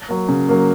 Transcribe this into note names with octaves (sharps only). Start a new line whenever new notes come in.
F#3 A#3
C#3
F#3 A#3